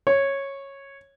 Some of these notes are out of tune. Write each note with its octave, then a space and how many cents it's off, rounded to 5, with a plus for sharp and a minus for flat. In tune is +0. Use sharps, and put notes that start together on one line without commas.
C#5 -10